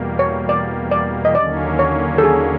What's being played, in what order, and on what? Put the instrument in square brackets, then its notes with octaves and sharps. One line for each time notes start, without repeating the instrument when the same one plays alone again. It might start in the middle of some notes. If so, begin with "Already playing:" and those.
Already playing: [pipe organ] E2 B2 G3 A#3
[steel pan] C#5
D5
D5
D#5
[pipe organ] D#2 D3 F#3 A#3 C#4 [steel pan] D5
[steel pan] C#5
A4
G#4